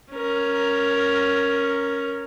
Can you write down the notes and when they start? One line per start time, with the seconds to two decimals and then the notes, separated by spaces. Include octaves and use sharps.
0.12 C#4 A#4